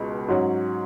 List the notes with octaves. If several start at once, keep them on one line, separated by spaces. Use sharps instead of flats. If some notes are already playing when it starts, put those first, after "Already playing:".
Already playing: C#2 B2 G#3
G#2 F#3 C#4